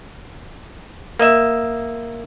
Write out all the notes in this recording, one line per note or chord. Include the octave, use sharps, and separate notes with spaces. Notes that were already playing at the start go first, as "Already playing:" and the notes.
A#3 D#5 E5